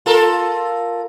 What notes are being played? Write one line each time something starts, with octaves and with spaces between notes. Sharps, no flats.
F4 A4 A#4